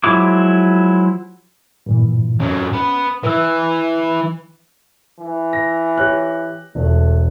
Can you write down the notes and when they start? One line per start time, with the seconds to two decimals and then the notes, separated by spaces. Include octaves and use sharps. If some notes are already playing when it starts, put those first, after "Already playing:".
0.04 F3 F#3 G#3 E4 D6
1.86 G2 A#2 E3
2.40 F2 F#3 C#4
2.73 B3
3.23 E3 B4 E6
5.20 E3
5.53 A#6
5.97 G4 C#5 F#6
6.75 E1 A3